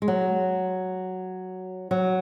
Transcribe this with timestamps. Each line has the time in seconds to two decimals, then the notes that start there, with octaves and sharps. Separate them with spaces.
0.02 G#3
0.08 F#3
1.91 F#3